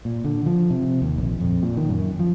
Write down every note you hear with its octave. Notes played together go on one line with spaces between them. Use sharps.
A#2
D3
F3
C3
D#2
A#1
F2
A#2
D#3
F#2
F3